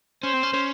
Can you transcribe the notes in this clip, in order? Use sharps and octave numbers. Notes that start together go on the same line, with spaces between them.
C#4 C5
C4
C#4
C#4